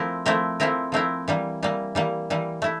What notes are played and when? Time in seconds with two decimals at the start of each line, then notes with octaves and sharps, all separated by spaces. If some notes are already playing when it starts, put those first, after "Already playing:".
Already playing: F3 A3 C4 E4 A#4
0.26 F3 A3 C4 E4 A#4
0.60 F3 A3 C4 E4 A#4
0.92 F3 A3 C4 E4 A#4
1.28 E3 G3 A#3
1.63 E3 G3 A#3
1.95 E3 G3 A#3
2.30 E3 G3 A#3
2.62 A3 E4